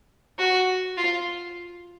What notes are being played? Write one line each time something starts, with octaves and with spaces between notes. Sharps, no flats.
F#4
F4